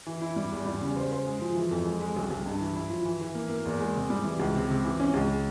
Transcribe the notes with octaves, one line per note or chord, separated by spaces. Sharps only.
E3
E4
G3
E2
G3
C#3
C5
C5
G#3
F3
E3
F2
G#3
G#3
C2
C2
G2
E3
E4
F3
E3
E3
A#3
A#3
E2
G#3
C3
G3
E3
C#2
C3
C3
E3
C#4
C#2